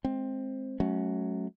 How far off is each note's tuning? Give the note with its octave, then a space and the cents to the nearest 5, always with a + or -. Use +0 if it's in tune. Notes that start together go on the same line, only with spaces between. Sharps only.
G#3 +25 C4 +10
F#3 +0 A3 -30 C#4 +0